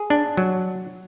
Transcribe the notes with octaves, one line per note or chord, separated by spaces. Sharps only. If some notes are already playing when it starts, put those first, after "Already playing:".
Already playing: G#4
D4
F#3